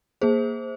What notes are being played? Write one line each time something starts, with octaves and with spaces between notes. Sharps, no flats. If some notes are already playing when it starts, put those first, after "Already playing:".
A#3 G#4 C5